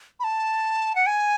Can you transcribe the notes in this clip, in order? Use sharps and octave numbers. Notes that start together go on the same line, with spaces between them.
B5
A5
F#5
G#5